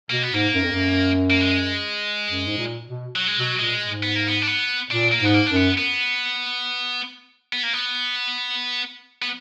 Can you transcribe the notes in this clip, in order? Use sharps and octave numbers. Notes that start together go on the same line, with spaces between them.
B2 A#3
B3
G#2 A#3
F#2
F2
F#2
A#3
G#3
F#2
G#2
A#2
B2
F#3
G#3
B2 F#3
A#2 G#3
G#2
B3
A#3
B3
D4
B3
A#2 D4
A#3
G#2 B3
A#3
F#2 D4
B3
B3
B3
A#3
B3
B3